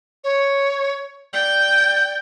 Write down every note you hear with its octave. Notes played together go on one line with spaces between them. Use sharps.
C#5
D5 G5